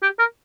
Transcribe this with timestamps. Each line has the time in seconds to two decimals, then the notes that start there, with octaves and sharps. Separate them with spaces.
0.03 G4
0.19 A#4